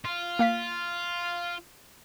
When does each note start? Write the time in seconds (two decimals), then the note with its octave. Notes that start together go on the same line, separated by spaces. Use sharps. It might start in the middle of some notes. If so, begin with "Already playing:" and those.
0.05 F4
0.39 A#3 F5 B6